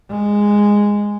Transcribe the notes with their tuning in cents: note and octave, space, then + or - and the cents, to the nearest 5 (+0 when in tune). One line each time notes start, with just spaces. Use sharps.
G#3 -10